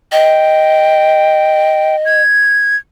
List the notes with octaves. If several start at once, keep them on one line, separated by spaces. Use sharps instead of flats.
D#5 G5
G#6